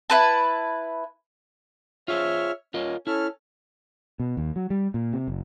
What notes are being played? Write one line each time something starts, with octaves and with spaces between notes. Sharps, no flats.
E4 B4 A5
F4 G#4 C5 C#5 E5 F6
C#4 F4 A#4 D#5
C#4 E4 A4 F6
B2
D#2
F#3
G3
A#2
C3
F#1